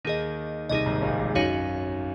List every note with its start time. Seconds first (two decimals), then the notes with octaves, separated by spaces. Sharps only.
0.05 D#2 D#3 D#4 G#4 D#5
0.69 C2 C3 D#4 G#4 D#5
0.86 G#1 G#2
1.02 A#1 A#2
1.19 G#1 G#2
1.35 F#2 D#4 F#4 C#5 F5